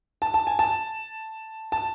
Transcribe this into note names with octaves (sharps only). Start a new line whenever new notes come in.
A5
A5
G#5
A5
A5